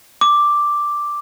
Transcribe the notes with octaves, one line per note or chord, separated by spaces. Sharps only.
D6